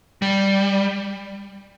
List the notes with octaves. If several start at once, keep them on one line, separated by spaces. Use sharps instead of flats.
G3